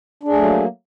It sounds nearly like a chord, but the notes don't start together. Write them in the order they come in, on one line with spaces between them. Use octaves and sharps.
D4 G#4 A3 F#3 A#3